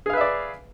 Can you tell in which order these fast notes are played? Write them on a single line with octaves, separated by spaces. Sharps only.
G#4 F5 B4 E5 D5